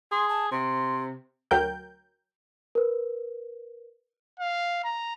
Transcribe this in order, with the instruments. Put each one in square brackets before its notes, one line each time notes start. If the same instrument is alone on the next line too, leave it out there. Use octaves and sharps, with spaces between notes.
[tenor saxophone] G#4 [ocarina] C6
[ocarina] A5
[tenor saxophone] C3 [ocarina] C6
[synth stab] D2 F#3 A#4 G5 G6
[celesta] A#4 B4
[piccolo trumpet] F5
A#5